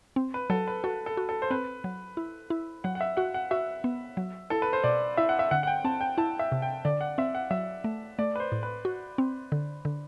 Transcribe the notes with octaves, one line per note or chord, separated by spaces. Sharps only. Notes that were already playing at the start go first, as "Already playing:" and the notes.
C4
B4
F#3 A4
B4
F#4 A4
A4
F#4
A4
C5
C4 B4
F#3
E4
E4
F#3 F#5
F#5
E5
F#4 F#5
F#5
F#4 E5
B3
F#3
E4 A4
B4
C5
B2 D5
E4 E5
F#5
E5
D3 F#5
F#5
G5
C4 A5
G5
E4 A5
E5
C3
G5
D3 D5
F#5
C4 E5
F#5
F#3 E5
A3
A3 D5
B4
C5
A2
B4
F#4
C4
D3
D3